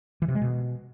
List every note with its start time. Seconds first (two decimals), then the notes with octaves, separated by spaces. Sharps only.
0.22 E3
0.28 C3
0.35 G#3
0.42 B2